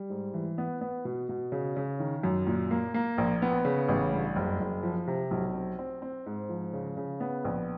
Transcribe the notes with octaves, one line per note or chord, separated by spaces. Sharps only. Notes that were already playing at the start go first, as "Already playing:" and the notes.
Already playing: G3
G#2
E3
B3
B3
B2
B2
C#3
C#3
D#3
F#2
A#2
A#3
A#3
A#1
B3
C#3
A1
G2
F#1
F#1
F3
C3
B1
C4
C4
C4
G#2
F3
C#3
C#3
B3
A#1